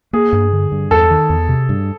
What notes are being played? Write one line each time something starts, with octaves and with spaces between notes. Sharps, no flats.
A#3 G#4
G2
D3
G2
E2 A4
D#3
E2
C3
G2